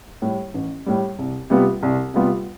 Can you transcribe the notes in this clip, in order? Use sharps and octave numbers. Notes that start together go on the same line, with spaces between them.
A2 G3
A1
A2 G3
C2
C3 G3 B3 F4
C2
C3 G3 B3 F4